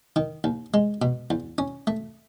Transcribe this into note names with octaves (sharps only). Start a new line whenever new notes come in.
D#3
D#2
G#3
B2
E2
C#4
A3